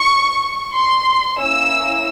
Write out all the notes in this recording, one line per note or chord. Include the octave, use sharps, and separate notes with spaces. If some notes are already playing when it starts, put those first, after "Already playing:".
Already playing: C#6
C6
A#3 C#4 E4 E6